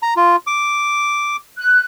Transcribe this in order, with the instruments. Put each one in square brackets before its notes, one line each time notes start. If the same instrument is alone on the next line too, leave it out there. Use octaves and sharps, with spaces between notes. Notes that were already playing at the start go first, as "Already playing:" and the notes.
[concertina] A#5
F4
D6
[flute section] F#6